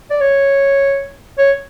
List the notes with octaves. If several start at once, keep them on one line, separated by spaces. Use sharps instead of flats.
D5
C#5
C#5